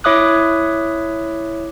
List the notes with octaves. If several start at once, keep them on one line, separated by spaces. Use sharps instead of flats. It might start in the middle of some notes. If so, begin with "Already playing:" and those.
E4 C#5 E5 D6 D#6 F#6